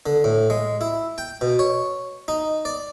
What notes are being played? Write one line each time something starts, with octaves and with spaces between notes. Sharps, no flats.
D3
A2
G#3
E4
G5
B2
C#5
D#4
D5